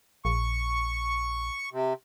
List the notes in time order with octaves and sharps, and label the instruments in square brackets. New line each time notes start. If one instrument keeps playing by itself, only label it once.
[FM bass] A#1 [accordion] C#6
[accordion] C3